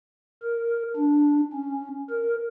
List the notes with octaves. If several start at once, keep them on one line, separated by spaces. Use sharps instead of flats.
A#4
D4
C#4
A#4